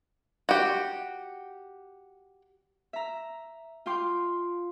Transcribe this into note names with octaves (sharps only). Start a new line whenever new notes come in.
F#4 G4
E5 A#5
F4 F5 G5 C6 D6